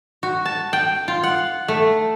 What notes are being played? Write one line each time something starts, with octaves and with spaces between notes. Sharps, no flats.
F#4
A5
G5
F4
F#5
A3